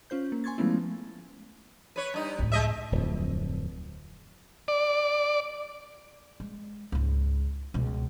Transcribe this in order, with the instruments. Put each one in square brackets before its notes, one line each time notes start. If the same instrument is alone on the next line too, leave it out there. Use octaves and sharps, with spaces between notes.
[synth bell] C#4 F4 C5 G6
A#3
G#5 C6 C#6 G#6 A6
F3 G#3 A3 B3 C#4 E4
[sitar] B4 C#5
G2 D#4
[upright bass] C#2 A2
[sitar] G#3 D#5 E5
[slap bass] D1 F2
[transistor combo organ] D5
[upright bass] G#3
C#2 G#2
C#2 B2